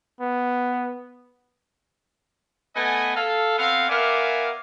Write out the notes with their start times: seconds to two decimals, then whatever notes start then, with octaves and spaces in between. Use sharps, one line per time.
0.21 B3
2.75 A3 B3 B4 D#5 G#5
3.16 A4 F5
3.58 B3 C4 A4 F5
3.89 B3 A#4 D5 E5 F5 G#5